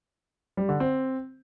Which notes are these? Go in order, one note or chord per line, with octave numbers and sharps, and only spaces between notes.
G3
D3
C4